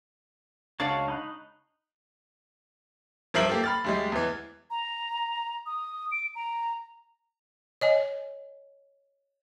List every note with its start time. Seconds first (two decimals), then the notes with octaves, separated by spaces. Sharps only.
0.80 C#2 D4 F#4 C#5 F5 A5
1.08 D#4 B5 F#6
3.34 G2 F3 A#4 E5 C7 F#7
3.50 A#3 G4 A4
3.64 B5 F6 A6
3.84 D2 G3 G#3
4.12 E2 E3
4.70 A#5
5.66 D#6
6.12 D7
6.35 A#5
7.81 C#5 D#5 G#5